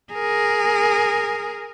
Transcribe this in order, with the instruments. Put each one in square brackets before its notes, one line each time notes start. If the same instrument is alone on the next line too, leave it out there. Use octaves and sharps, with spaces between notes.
[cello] G#4 A#4